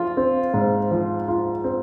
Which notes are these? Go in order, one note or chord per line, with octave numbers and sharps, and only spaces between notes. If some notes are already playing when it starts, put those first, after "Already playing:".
Already playing: F3 F4
C4
G#2
F3
F4
C4